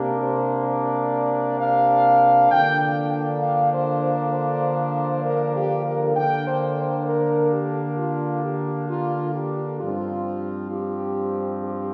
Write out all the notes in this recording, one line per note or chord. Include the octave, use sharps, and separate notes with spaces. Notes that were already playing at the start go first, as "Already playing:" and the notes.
Already playing: C3 A#3 D4 G4
C5
D5
F5
D3 F3 A#3 D4 G5
G5
G5
F5
C5
C5
C5
A#4
G4
A#4
D3 A#3 D4 G5
C5
C5
A#4
G4
F4
G4
F4
G4
G2 F3 C4 F4
G4
G4